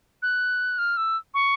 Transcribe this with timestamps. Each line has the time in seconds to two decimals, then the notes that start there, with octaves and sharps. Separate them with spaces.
0.22 F#6
0.78 F6
0.97 E6
1.34 C#6